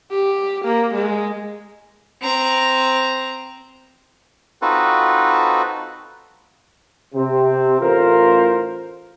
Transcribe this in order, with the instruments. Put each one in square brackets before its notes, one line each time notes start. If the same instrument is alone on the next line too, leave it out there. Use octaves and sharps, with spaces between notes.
[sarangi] G4
A#3
G#3
[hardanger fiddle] C4 A#5
[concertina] C4 D#4 F4 F#4 A4 B4
[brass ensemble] C3 C4
A1 F4 A#4 C5